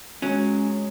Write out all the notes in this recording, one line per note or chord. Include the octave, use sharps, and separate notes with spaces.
F#3 G#3 C#4